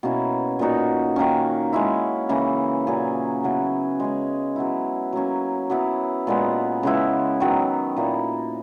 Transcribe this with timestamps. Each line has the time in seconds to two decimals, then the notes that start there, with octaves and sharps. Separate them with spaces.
0.03 B2 A#3 C#4 E4
0.59 A#2 A#3 D#4 F#4
1.16 D#3 A#3 C#4
1.73 G#3 C#4 E4
2.29 C#3 E3 A#3
2.87 A#2 F#3 C#4 G#4
3.43 C#3 F#3 B3 E4
4.00 G#3 C#4 G#4
4.56 F#3 B3 E4
5.13 F#3 A#3 C#4
5.70 F#3 B3 E4
6.27 A#2 G#3 B3
6.83 C#3 G#3 B3 E4
7.40 D#3 F#3 B3
7.97 A#2 A#3 E4